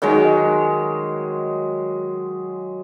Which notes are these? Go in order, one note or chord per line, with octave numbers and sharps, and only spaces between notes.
D#3 F#3 G#3